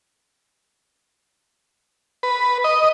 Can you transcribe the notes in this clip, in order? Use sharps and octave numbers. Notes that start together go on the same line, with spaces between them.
B4
D#5